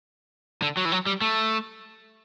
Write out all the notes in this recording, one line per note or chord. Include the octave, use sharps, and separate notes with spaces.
D3
F#3
E3
F#3
G3
A3